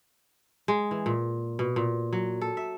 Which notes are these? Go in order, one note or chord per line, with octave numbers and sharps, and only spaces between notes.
G#3
E3
A#2
B2
A#2
F#3
A4
E5